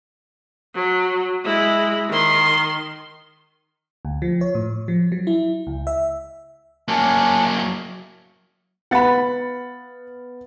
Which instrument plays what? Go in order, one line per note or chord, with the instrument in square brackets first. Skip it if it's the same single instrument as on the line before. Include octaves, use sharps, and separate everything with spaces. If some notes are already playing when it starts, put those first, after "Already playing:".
[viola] F#3
G#3 E4
D#3 C6
[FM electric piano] D2
F3
C#5
A2
F3
F#3
E4
C#2
E5
[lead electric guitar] F#3 A#3 [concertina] C#4 D4 C#5
[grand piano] B3 F5 A6 [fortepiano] F#5 B5